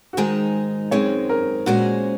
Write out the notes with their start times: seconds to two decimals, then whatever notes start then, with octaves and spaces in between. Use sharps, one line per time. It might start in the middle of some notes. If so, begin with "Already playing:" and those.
0.13 F#4
0.17 G#2 D#3 G#3 D#4 G#4
0.91 F#2 D#3 G#3 C4 C#5
1.29 A#4
1.66 A#2 G#3 C#4 F#4 G#4 C5